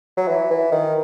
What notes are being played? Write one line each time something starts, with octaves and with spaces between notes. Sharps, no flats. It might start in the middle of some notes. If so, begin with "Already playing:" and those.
F#3
E3
E3
D#3